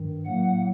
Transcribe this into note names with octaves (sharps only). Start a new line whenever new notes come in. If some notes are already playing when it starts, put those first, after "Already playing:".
Already playing: G2 D#3
A2 F#3 A#3 F#5